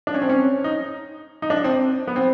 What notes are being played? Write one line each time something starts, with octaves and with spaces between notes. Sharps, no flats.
D4
C#4
C4
C#4
D#4
D#4
D4
C4
B3
C4